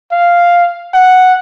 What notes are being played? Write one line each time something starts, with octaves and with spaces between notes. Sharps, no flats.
F5
F#5